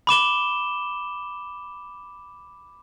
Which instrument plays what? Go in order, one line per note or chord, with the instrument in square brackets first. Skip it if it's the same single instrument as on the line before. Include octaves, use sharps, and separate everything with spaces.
[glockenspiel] B5 D6 E7 G7